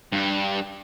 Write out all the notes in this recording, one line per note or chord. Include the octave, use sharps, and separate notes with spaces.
G2 G3